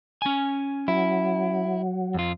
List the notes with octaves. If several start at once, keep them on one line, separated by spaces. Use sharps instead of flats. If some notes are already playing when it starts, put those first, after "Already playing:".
C#4 G#5
F#3 E4
F2 F4